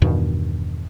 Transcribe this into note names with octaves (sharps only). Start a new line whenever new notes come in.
E2 G2 B2 D#3